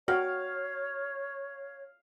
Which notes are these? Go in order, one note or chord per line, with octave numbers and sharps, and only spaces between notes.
F#4 A#4 C#5 F5 G5